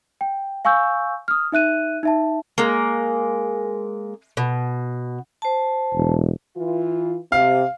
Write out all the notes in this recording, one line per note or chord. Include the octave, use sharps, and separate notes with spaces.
G5
F5 G#5 C#6 E6 G6
D#6 F6
D#4 E5 F#6 D#7
D#4 E5 A5
G#3 A#3
B2
C5 A5
E1
E3 F4
C3 F5